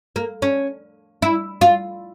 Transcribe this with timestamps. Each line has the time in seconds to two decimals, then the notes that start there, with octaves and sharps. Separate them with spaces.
0.16 A#3
0.42 C#4
1.22 E4
1.61 F4